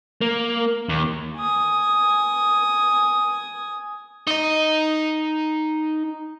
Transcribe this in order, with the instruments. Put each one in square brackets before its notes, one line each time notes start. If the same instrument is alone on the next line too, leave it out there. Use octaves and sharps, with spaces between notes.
[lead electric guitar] A#3
D#2
[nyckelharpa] G#5 D#6
[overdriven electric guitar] D#4 D#5